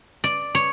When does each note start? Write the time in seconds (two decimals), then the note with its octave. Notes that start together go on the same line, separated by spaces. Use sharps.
0.24 D5
0.55 C#5